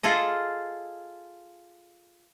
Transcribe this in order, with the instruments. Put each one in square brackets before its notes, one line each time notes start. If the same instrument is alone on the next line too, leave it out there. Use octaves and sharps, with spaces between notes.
[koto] F4 G#4 A4 D#5